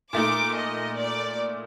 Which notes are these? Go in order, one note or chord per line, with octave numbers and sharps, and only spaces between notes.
A#2 A3 D#4 D6
D#5
D5